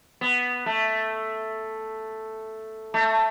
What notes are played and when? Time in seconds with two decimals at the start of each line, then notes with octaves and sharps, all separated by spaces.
0.21 B3
0.66 A3
2.94 A3